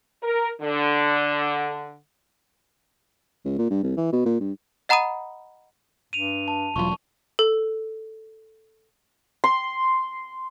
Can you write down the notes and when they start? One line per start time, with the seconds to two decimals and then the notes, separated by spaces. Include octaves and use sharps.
0.22 A#4
0.61 D3
3.45 C#2
3.59 A#2
3.70 G2
3.83 C2
3.97 E3
4.12 B2
4.25 A#2
4.40 G2
4.89 D#5 F#5 A#5 B5 D#6 D#7
6.13 G2 D#7 F7
6.48 A5
6.76 E1 F#3 F4 C#6
7.39 A4
9.44 C6